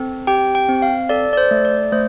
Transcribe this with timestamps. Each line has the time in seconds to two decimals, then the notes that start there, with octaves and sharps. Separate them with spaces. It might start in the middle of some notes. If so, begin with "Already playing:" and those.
Already playing: C4 A4
0.27 G4 G5
0.55 G5
0.69 C4
0.82 F5
1.09 A4 D5
1.33 D5
1.37 C5
1.51 A3
1.65 D5
1.92 A3 C5